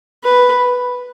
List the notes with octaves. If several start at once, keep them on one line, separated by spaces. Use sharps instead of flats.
B4